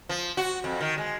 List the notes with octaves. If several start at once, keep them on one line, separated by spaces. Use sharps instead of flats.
F3
F#4
F2
D#3
G#3